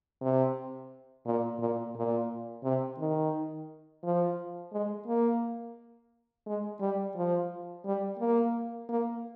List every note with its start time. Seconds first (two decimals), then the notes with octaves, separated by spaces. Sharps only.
0.21 C3
1.26 A#2
1.59 A#2
1.95 A#2
2.64 C3
2.98 D#3
4.03 F3
4.72 G#3
5.07 A#3
6.46 G#3
6.80 G3
7.16 F3
7.85 G3
8.19 A#3
8.89 A#3